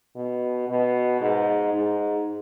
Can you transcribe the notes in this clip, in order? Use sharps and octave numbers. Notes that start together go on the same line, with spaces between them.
B2
B2
G#2
G#2